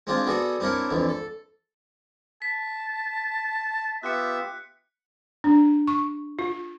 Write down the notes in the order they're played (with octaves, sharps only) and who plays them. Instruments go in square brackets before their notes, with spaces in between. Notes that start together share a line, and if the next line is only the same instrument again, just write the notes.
[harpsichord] G#3 C4 D4 F4 G#4
B3 F#4 G#4 A4 D5 G#5
C4 D4 E4 A#4 C#5
F2 D3 E3
A4
[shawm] A5 [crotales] B6
[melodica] B3 F4 G4 [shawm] E5 [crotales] F#6 C#7
[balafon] D4
C#6
F4